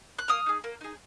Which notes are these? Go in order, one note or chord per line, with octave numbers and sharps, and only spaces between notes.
F#6
A#3 D#6 F6
D#4 G#4
A#3
D#4 G#4